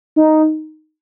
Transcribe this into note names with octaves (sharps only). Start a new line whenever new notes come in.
D#4